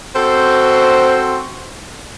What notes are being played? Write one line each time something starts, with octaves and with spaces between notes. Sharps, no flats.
C4 F#4 A4 C5